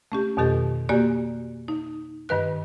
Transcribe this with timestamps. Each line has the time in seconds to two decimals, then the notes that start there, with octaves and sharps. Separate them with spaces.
0.12 A3 C#4 G4
0.37 F2 B2 D#3 G4 A4
0.89 A#3 F#4 G4 D5 G#5
1.68 D#4
2.29 G2 D#3 B4 F#6